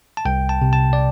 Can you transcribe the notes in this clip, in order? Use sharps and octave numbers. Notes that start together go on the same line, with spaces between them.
A5
C2 G5
A5
C3
A5
D5